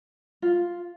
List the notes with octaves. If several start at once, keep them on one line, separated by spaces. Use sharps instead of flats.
F4